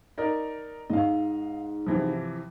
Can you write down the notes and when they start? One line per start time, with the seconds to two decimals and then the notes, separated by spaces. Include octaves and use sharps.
0.18 D#4 A#4 D5
0.90 G#2 D#5 F5
1.86 C3 E3 F3